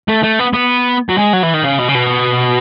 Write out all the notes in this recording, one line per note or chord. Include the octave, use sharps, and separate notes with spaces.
A3
A3
B3
B3
F#3
G#3
F#3
E3
D#3
C#3
B2
C#3
B2